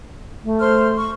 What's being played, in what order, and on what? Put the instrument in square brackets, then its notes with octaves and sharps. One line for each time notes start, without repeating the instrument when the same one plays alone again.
[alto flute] A3
[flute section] C5 C6 F6
C#6